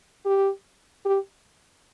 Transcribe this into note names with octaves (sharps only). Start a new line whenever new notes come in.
G4
G4